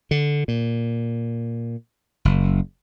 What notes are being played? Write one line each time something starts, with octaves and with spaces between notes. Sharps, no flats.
D3
A#2
F#1